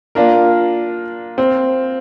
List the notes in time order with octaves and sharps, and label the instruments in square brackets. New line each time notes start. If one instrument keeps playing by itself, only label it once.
[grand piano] A#3 F4 A#4 [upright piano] D4
[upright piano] C4